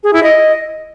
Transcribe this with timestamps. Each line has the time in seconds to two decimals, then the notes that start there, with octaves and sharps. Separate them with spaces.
0.04 G#4
0.13 E4
0.23 D#5